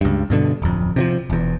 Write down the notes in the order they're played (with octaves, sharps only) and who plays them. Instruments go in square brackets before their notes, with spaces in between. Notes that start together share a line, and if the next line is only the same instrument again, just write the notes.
[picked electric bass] C#2 G2
G2 B2 D3
D1 F2
C3 D#3 F3
E1 E2